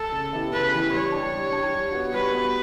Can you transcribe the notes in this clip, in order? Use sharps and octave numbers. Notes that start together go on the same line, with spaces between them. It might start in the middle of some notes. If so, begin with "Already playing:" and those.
Already playing: A4
C#3
E3 B3 E4 G4
C#3 B4
E3 B3 E4 G4
G3 C#5
D4 G4
G3
D4 G4
G3
B3 F#4
G3 B4
B3 F#4